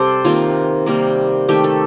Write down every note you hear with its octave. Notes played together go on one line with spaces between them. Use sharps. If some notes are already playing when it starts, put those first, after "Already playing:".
Already playing: C3 G3 A4 C5 D5
C3 D#3 A#3 F4
C3 D#3 G3 A#3
D#3 A3 G4
A4